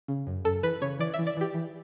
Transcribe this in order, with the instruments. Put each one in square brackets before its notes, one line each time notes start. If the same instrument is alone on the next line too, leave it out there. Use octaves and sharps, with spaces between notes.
[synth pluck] C#3
F#2
F#2 A4
E3 B4
C#3 C#5
E3 D5
E5
E3
D5
E3 G4
E3